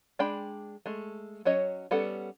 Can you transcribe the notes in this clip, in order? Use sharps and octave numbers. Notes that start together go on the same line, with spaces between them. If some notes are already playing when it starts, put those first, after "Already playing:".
G#3 D4 G5 B5
G#3 A3
F#3 C#4 C#5 D#5
G3 B3 C#4 A4 F#5